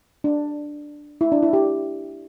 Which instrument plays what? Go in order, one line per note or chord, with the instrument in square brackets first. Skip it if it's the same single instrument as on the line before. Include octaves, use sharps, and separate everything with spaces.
[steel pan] D4
E4
D4
E4
G4